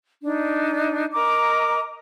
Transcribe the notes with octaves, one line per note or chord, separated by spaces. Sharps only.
D4 D#4
A#4 D#5 A#5 D6